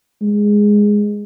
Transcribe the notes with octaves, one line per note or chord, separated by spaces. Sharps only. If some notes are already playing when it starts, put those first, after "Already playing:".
G#3